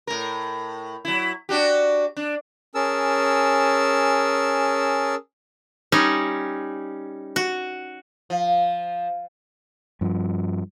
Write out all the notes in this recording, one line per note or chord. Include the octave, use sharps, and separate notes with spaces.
A2 A#4
F#3 E4
D4 F#4 G4
D4
C#4 G#4 A#4 A5 E6
G3 C#4 D#4
F#4
F3
G2 F3